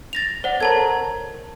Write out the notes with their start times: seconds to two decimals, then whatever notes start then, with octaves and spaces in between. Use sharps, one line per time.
0.13 A6 A#6 F7
0.44 C5 D5 F#5
0.61 A4 A#4 C#5 A5 A#5 G#6